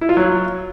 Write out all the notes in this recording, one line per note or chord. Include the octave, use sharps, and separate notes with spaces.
E4
F4
F#3